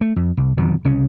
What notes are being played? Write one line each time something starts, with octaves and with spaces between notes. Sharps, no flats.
A3
F2
C2
E1 F2 D#3 F#3
C2 C#3 C#4